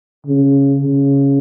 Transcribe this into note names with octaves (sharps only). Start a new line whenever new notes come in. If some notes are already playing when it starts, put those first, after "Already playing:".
C#3
C#3